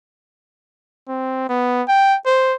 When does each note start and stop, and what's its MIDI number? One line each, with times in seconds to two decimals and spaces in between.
1.09 1.49 60
1.49 1.83 59
1.88 2.17 79
2.26 2.55 72